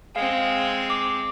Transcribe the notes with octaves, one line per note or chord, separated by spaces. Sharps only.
G#3 C4 F5
D6